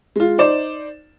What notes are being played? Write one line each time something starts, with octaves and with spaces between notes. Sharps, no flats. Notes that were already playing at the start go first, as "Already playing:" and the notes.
G#3 F4
D#4 C5 D5 E7